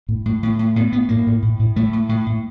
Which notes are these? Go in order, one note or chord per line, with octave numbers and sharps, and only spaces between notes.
A2
A2
A2
A2
A2 B3
A2 B3
A2 A#3
A2
A2
A2
A2 A3
A2
A2
A2